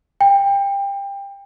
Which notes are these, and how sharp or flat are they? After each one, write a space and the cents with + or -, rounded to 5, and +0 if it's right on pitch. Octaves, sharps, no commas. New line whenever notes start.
G5 +25